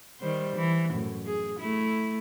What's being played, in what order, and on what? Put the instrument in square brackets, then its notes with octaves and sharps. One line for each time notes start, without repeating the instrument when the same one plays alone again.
[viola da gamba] D#3 G3 C5
E3
F#2 A2
G#4
A3 E4